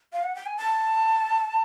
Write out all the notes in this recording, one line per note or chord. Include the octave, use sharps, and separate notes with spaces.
F5
F#5
G5
G#5
A5